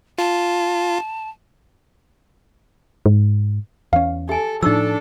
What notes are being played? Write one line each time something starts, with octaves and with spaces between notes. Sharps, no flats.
F4 A5
G#2
E2 C#4 F5
G4 A4 G#5
A2 F3 D4 D#4 A4 C#6 E6